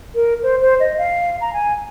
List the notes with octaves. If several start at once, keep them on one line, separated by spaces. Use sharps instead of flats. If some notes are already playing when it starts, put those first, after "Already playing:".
A#4
C5
C5
D#5
F5
A#5
G#5